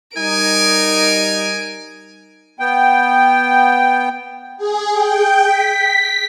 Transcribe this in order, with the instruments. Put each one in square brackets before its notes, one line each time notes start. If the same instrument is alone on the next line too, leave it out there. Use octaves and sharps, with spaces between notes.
[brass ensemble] G3 D#4 [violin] A#4 D7 [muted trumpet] G#5
[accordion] B3 G5
[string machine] G#4
G5
B6